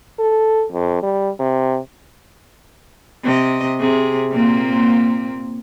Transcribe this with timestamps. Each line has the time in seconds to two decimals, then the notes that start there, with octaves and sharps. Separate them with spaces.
0.19 A4
0.72 F2
1.03 G3
1.39 C3
3.24 C3 D#5
3.80 C3 G#4
4.31 A#2 A#3 C4